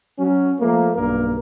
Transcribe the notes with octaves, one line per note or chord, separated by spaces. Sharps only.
F#3 C#4
F3 A3 A#3
B1 G2 A#3 A#4